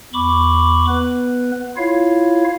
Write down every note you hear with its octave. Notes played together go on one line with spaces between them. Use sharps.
E2 B5 C#6 D6
B3 B4
E4 F4 C#5 F5